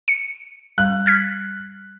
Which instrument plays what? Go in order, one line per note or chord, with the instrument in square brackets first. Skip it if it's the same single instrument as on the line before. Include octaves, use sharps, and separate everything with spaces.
[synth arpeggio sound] C#7
[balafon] G3 [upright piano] F#6
[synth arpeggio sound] F6 G#6 B6